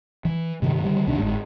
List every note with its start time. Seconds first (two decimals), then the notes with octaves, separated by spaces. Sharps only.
0.25 E3
0.62 G2 C3 D#3
0.83 D3 D#3 G3
1.07 C2 B2 D#3 D4
1.19 G1 G#2